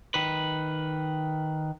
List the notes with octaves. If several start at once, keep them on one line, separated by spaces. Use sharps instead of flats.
D#3 B4